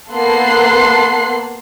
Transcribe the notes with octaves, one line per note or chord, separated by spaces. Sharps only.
A#3 B3 A4 C6 F#6 C7